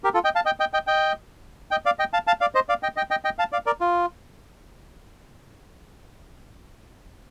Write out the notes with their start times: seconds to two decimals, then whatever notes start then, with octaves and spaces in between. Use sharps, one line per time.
0.04 G4 A#4
0.14 F4 A4
0.24 D#5 G5
0.35 F5 A5
0.45 D#5 G5
0.60 D#5 G5
0.73 D#5 G5
0.87 D#5 G5
1.71 D#5 G5
1.85 D5 F5
1.99 D#5 G5
2.13 F5 A5
2.27 F5 A5
2.41 D5 F5
2.55 C5 D#5
2.69 D5 F5
2.83 D#5 G5
2.96 D#5 G5
3.11 D#5 G5
3.25 D#5 G5
3.39 F5 A5
3.52 D5 F5
3.66 A#4 D5
3.81 F4